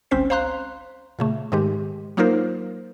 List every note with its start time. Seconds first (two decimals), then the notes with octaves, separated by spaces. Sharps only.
0.11 G1 C#2 C4 C#4 C5 B6
0.30 C5 F5 A#5 C6 F#6
1.19 A#2 C#3 A3
1.52 G#2 D#3 G#3 G4
2.17 F#3 A#3 D#4 F4 A#4 C5